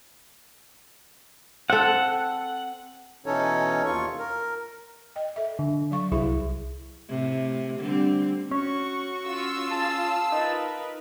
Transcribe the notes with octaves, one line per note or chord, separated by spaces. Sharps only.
C4 A4 F#5
B2 E3 C#4 D#4 A4 C#5
D#2 F4 C#6
A#4
D#5 G5
A4 E5
D3
F#3 F5 C#6
C2 E4 G#4 E5
A2 C3
D3 G3 C4
C#4 F#4 C#6
F4 E6
G#4 F5 A5
D#4 A#4 B4